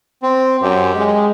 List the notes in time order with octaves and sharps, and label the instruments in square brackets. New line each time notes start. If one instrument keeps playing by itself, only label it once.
[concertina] C4
[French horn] F#2 [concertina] G4
[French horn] G#3